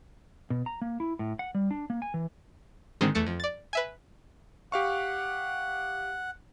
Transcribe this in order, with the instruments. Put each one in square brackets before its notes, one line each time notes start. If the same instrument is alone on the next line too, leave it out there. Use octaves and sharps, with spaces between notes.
[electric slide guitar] B2
A#5
A#3
E4
A2
F#5
G3
D4
A#3
G#5
E3
[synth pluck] G#2 D3 D#3 G#3 C4
E2 A3 C#7
F2
D5 A6
B4 E5 G#5
[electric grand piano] G4 F5 C#6 [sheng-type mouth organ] F#5